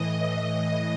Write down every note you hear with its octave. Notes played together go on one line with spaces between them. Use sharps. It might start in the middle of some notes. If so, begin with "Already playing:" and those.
Already playing: A2 E3 D#5
D#5